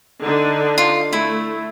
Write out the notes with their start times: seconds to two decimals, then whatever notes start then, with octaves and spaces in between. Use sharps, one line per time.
0.22 D3 D4 D#4
0.78 F4
1.13 A3 E4